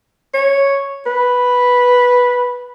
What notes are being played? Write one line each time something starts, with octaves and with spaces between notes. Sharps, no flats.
C#5
B4